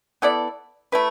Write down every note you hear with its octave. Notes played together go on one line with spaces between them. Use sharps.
B3 E4 A4 D5
A3 E4 B4